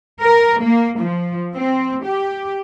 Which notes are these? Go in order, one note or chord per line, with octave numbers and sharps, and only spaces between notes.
A#4
A#3
F3
C4
G4